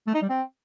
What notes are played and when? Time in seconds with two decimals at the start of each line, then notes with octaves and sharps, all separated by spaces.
0.07 A3
0.14 D#4
0.22 G3
0.29 C4